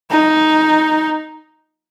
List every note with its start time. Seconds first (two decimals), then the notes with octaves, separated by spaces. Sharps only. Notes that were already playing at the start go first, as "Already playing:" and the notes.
0.11 D#4